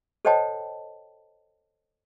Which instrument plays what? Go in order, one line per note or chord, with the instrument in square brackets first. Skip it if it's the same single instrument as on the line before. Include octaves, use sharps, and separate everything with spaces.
[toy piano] A4 C5 C#5 D#5 G5 A5